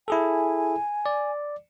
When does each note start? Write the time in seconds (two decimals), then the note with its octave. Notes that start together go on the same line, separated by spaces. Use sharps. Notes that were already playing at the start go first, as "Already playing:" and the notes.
0.08 E4 G#4 A4 G#5
1.06 D5